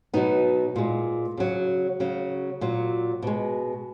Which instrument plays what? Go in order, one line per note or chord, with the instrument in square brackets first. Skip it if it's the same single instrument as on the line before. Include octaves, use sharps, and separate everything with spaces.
[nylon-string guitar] B2 F#3 B3 D#4
A#2 G#3
C#3 F#3
C#3 F#3
A#2 F#3
B2 G#3